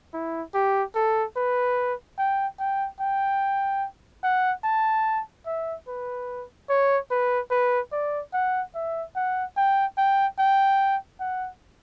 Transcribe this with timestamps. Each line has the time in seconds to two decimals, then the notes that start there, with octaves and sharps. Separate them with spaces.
0.14 E4
0.54 G4
0.95 A4
1.36 B4
2.18 G5
2.59 G5
3.00 G5
4.23 F#5
4.64 A5
5.46 E5
5.88 B4
6.69 C#5
7.11 B4
7.51 B4
7.92 D5
8.33 F#5
8.75 E5
9.16 F#5
9.57 G5
9.98 G5
10.39 G5
11.20 F#5